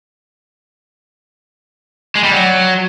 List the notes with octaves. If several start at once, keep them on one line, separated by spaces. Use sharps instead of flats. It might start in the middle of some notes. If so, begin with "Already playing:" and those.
G#3
G3
F#3